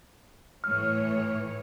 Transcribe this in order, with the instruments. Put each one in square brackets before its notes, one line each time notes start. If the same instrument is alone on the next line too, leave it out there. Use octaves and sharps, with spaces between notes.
[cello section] A2 E3 C#5 [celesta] F6